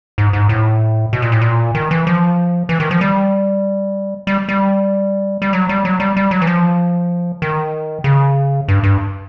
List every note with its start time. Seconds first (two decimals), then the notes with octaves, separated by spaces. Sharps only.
0.18 G#2
0.33 G#2
0.49 A2
1.13 B2
1.22 A#2
1.32 A2
1.41 A#2
1.75 D#3
1.91 E3
2.07 F3
2.69 E3
2.80 D#3
2.91 F3
3.01 G3
4.27 G3
4.49 G3
5.42 G3
5.53 F#3
5.69 G3
5.85 F#3
6.00 G3
6.17 G3
6.31 F#3
6.42 E3
6.47 F3
7.42 D#3
8.04 C#3
8.68 G2
8.83 G2